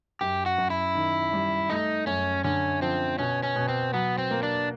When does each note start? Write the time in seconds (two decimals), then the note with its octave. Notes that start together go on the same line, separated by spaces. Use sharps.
0.21 F#2 G4
0.46 F#4
0.58 F#2
0.70 E4
0.95 D#3
1.33 G3
1.70 A3 D#4
2.07 F#2 C#4
2.44 D3 C#4
2.82 F3 C4
3.18 B2 C#4
3.43 C#4
3.56 B2
3.68 C4
3.93 F#3 B3
4.18 C4
4.31 A#3
4.43 D4